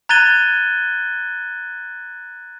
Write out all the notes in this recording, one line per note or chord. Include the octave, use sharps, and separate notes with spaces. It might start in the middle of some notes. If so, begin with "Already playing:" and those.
A#5 F#6 G#6 A6 D#7 G7